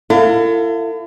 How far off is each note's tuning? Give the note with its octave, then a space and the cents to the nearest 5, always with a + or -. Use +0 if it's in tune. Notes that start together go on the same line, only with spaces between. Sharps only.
E4 +40 A4 +40 F5 +25